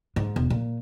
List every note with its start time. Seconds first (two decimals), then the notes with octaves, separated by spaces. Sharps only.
0.16 G#2
0.36 E1
0.50 A#2